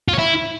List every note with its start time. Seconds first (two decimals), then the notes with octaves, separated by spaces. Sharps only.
0.08 F4
0.13 C#5
0.19 E4